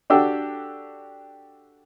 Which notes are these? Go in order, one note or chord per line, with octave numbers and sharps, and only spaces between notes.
D4 F#4 G4 A4 E6